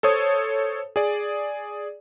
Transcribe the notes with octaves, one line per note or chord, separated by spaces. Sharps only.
A4 C5 C#5 D#6
G#4 D5